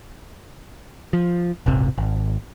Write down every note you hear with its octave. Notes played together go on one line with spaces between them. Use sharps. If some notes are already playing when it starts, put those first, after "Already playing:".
F3
D#1 G#1 C3
G#1